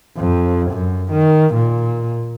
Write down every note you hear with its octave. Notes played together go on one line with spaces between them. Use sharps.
F2
F#2
D#3
A#2